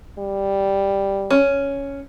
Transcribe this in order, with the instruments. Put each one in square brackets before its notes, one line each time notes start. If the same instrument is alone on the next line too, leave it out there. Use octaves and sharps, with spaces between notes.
[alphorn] G3
[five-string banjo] C#4